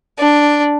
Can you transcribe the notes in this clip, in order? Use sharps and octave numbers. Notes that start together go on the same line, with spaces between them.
D4